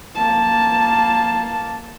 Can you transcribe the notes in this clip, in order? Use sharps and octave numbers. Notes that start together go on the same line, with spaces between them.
A#3 A5